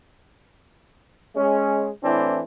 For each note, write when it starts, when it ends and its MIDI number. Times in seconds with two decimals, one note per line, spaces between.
1.35 1.89 56
1.35 1.89 61
2.04 2.43 45
2.04 2.43 52
2.04 2.43 60
2.04 2.43 62